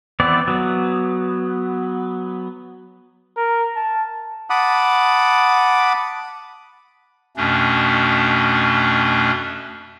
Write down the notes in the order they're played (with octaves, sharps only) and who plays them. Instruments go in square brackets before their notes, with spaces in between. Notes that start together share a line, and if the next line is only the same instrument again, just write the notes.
[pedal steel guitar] E3 B3 C4 D5
F#3 B3
[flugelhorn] A#4
A5
[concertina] F#5 A5 B5 D6 D#6
[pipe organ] F2 B2 A3 C#4 D4